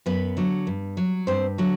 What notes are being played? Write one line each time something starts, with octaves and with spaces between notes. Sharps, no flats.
F#2 B3 B4
D3 F#3
G2
F#3
G2 C4 C5
D3 F#3